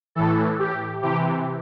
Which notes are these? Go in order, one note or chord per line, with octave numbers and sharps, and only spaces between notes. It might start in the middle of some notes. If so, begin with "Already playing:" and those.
A2 E3 A4
G4
C3 E3 G4